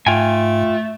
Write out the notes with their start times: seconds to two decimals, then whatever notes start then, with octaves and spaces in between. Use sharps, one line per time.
0.07 G#2 A3 F4 G5 G#5